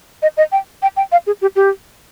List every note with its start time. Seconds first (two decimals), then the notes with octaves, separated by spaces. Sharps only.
0.22 D#5
0.37 D#5
0.52 G5
0.82 G5
0.97 G5
1.12 F5
1.27 G#4
1.41 G4
1.56 G4